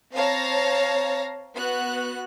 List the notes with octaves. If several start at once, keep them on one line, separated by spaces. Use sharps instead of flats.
C4 C#5 F5 A5 A#5 A#6
B3 F#4 F#6